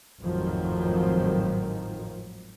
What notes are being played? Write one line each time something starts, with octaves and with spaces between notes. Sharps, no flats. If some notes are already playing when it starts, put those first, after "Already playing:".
G#1 F2 A2 D#3 F3 F#3